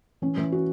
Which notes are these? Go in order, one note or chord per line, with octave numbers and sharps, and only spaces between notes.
E3 C#4
E3 E4
F#4